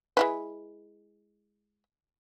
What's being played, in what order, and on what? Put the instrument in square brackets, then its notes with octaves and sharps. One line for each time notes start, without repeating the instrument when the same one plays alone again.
[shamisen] G#3 E4 B4